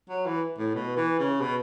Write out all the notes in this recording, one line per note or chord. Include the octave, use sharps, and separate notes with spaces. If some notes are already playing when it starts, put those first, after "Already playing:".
F#3
E3
A2
B2
E3
C#3
B2